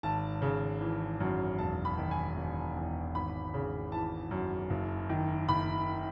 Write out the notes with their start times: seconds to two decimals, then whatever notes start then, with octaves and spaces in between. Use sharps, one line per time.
0.03 G#1 A5
0.42 C#3
0.81 E3
1.20 F#2
1.58 E1 A5
1.85 B5
1.98 D#3
2.11 G#5
2.36 E1
2.76 E2
3.15 G#1 B5
3.54 C#3
3.92 E3 A5
4.31 F#2
4.70 F#1
5.09 D#3
5.48 F#1 B5